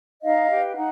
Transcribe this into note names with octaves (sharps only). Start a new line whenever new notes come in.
D#4 D#5 F5
G4 B4
D#4 F#5